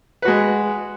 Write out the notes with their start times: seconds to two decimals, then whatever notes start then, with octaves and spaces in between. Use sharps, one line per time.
0.22 B4
0.25 F#4
0.28 G#3